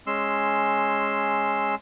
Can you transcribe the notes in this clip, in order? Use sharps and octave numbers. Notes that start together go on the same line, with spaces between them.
G#3 C#4 C6 E6